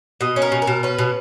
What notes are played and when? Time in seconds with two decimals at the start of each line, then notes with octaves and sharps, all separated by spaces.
0.21 B2 D#5
0.36 C#4
0.42 A#4
0.52 B2
0.62 A#4
0.67 B2
0.83 C#4 B4
0.99 B2